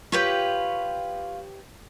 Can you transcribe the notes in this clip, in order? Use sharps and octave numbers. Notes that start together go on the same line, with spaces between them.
F4 G4 B4 C#5